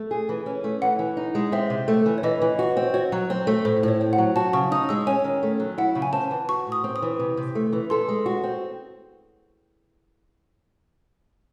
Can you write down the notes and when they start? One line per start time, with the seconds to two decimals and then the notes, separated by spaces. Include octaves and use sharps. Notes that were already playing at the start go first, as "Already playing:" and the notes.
Already playing: A3
0.11 G#4
0.29 E3
0.46 C#4
0.64 A3
0.82 E3 F#5
0.99 E3
1.17 D#4
1.35 G#3
1.52 C4 E5
1.70 C3
1.88 A3
2.06 E3
2.18 C#5
2.23 E3 D#5
2.42 E3
2.59 F#4
2.77 C4
2.94 F#4 C#5
3.12 F#3
3.30 C4
3.47 A3
3.65 A2 C5
3.83 A2
3.88 C#5
4.01 C4
4.13 F#5
4.18 F#3
4.36 F#4 A5
4.53 C#3 C#6
4.71 D#4 D#6
4.89 G#3 E6
5.07 C#4 G#5
5.24 D#3
5.43 A3
5.60 F#3
5.78 E4 F#5
5.95 C#3
6.02 G#5
6.13 C4 A5
6.31 E3
6.49 F#4 C#6
6.67 A2
6.72 D#6
6.84 C4
6.96 D#6
7.02 E3
7.20 C3
7.37 C3
7.55 A3
7.73 E3
7.90 A4 C6
8.08 G#3
8.26 F#4
8.43 C4